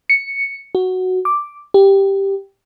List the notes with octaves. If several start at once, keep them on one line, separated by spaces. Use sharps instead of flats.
C#7
F#4
D6
G4